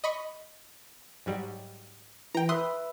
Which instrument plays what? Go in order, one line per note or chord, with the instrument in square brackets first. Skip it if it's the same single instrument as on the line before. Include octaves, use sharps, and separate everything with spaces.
[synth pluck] D#5 B5 C#6
G#2 F#3 G3
[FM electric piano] E3 [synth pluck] G5 A#5
[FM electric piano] B4 E5 [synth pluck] C6 D#6 F#6